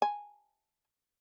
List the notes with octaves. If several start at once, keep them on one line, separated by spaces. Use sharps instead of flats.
G#5